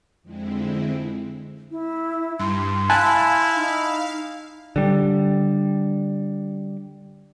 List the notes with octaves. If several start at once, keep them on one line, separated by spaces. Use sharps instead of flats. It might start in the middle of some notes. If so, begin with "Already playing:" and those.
F2 D3 G#3 C4 E4
E4
G2 C6
E4 F5 G#5 A5 F#6
D#4
D3 G3